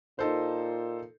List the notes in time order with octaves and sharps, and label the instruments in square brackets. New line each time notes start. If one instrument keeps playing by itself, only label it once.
[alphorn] A#2 [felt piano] D#4 A4 C5